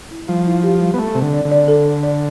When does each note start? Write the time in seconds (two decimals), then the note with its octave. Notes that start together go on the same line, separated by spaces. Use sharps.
0.11 E4
0.28 F3 G3
0.46 E4
0.63 G4
0.81 G3
0.94 B3
0.98 A3 A4
1.15 C3 C4
1.22 D3
1.33 D5
1.45 D3
1.51 D5
1.68 A4
1.86 D5
2.03 D5